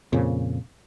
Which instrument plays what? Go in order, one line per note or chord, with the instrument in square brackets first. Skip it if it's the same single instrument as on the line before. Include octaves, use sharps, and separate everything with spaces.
[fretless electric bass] F2 A#2 C#3